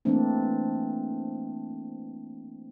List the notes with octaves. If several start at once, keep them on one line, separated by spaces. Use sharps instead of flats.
E3 A3 A#3 C4 D4